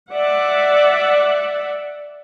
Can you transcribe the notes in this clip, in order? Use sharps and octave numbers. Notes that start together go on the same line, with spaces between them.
D5 E5 F#5